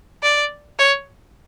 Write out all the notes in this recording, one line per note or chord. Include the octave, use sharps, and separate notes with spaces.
D5
C#5